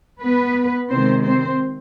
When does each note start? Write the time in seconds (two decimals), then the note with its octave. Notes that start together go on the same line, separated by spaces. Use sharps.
0.20 B3 B4
0.89 C3 D#3 G#3 C4 C5
1.23 C4 C5